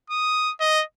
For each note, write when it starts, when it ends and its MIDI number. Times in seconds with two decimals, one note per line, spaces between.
0.10 0.52 87
0.60 0.84 75